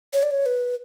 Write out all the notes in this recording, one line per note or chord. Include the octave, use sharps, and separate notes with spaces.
C#5
D5
C#5
B4